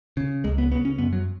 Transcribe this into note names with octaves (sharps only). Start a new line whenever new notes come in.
C#3
C#2 G#3
B3
C#3 B3
C#4
F#2 B3
F#3